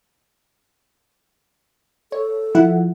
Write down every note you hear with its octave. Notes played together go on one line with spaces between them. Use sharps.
A4 C#5
F3 E4 F#5